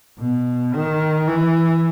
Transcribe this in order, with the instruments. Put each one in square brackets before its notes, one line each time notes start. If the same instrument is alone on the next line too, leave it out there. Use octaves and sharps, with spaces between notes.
[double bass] B2
D#3
E3